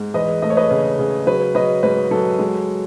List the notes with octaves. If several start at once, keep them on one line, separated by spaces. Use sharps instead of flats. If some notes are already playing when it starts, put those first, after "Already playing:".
Already playing: G#2
E2 B4 D#5
A3 D#5
C#5
B4 D#5
C#3
C#3
F#3 B4
F#3 B4 D#5
G#2 B4
F#3 A4
G#3